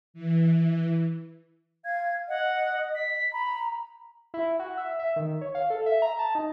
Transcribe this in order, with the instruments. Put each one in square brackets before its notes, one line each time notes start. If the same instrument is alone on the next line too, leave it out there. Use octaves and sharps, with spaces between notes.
[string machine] E3
[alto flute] F5 [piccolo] G#6
[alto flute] D#5 [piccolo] F#5
[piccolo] B6
[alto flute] A#5 [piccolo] B5
[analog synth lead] E4
F#4
E5
E5
D#3
C#5
F5
A4
E5
A#5
A5
D#4